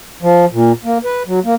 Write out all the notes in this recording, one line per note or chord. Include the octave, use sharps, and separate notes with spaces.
F3
A#2
A#3
B4
F#3
A#3